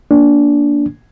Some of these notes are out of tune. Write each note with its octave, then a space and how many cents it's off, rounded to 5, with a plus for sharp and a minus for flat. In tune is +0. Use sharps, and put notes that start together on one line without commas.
A#3 +0 D4 -20